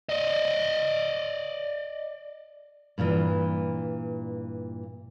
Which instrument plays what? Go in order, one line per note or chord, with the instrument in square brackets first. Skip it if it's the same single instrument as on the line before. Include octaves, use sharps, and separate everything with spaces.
[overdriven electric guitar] D5 D#5
[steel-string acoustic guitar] G2 A#2 D3 E3